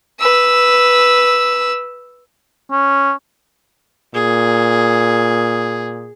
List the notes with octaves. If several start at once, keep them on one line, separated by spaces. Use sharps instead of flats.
B4 E6
C#4
A#2 G#4